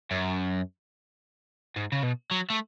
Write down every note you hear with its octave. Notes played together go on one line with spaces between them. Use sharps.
F#2
G#2
C#3
B2
F#3
A3